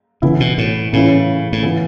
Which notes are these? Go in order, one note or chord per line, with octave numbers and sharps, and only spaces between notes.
C#3 E3 B3 E4
B2
A2
A2 C#3 E3 C#4 E4
A2
E3 B3 E4